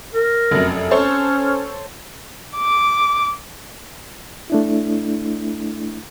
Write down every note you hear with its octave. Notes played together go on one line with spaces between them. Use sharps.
A#4
F1 F#2
C#4 A4 C5 C#5
D6
A3 D4 E4